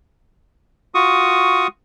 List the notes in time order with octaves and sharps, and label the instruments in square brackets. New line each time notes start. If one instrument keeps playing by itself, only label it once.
[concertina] F4 F#4 C#6 D#6